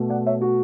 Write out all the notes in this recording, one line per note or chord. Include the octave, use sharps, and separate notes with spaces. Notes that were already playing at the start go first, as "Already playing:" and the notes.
Already playing: B2 A3
D5 F#5
C#5 E5
F#4